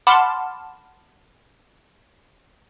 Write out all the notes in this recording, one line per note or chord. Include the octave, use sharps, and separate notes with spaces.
F#5 A5 B5 C6 D6 F6